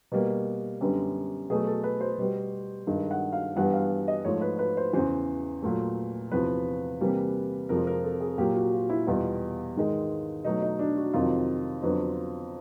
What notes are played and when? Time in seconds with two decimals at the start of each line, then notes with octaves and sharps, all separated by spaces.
0.12 B2 G3 A#3
0.81 F#2 D3 G3 B3
1.50 B2 F#3 A3 G#4
1.67 A4
1.84 B4
2.01 C5
2.18 B2 G3 B3
2.87 G2 D#3 G#3
3.11 F#5
3.33 F5
3.56 G2 E3 G3 B3 F#5
3.74 F5
4.08 D#5
4.25 G#2 F3 A3 C#5
4.42 B4
4.59 B4
4.77 C5
4.93 E2 C#3 E3 C5
5.62 A#2 F#3 A3
6.32 E2 C3 F3 B4
7.01 C3 E3 G3 A#3
7.69 F2 C3 F3 G#3 A#4
7.87 A#4
8.04 A4
8.21 G#4
8.38 A#2 F#3 A#3 G4
8.56 F#4
8.73 F4
8.90 E4
9.07 E2 B2 G3 B3 F4
9.76 G#2 D#3 G#3
10.45 B2 F#3 A3 D#4
10.62 D#4
10.79 D4
10.97 F#4
11.13 F2 C3 D#3 F#3 F4
11.82 F2 D3 F#3 B3